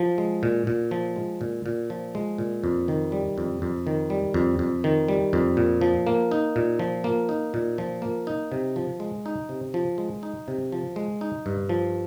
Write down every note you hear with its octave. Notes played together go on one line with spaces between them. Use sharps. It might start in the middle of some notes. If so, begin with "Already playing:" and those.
Already playing: F3
G#3
A#2
A#2
F3
G#3
A#2
A#2
F3
G#3
A#2
F2
D#3
G3
F2
F2
D#3
G3
F2
F2
D#3
G3
F2
A#2
F3
A#3
D#4
A#2
F3
A#3
D#4
A#2
F3
A#3
D#4
C3
F3
G#3
D#4
C3
F3
G#3
D#4
C3
F3
G#3
D#4
G2
F3